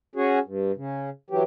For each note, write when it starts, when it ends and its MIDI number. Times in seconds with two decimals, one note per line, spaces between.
0.16 0.39 61
0.16 0.39 66
0.16 0.39 68
0.45 0.72 43
0.76 1.10 49
1.30 1.43 52
1.30 1.43 54
1.30 1.43 67